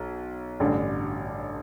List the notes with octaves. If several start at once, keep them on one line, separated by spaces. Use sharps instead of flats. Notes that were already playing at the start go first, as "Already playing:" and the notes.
Already playing: B1
A1 G2 D3